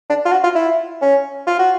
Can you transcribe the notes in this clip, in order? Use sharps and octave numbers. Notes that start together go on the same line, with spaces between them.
D4
F4
F#4
F4
E4
C#4
F4
F#4